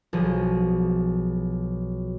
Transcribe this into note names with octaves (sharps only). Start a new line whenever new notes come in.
B1 F3 G#4